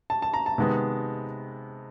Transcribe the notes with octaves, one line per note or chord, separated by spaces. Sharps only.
A5
A5
A#5
A5
C3 D#3 G#3 B3